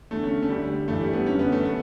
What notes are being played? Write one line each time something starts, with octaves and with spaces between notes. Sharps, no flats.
E2 D3 A3
C#4
A3
D2 D3 G3
G2 E3 A3
G3
B3
F#2 D3 C#4
B3
A3
B3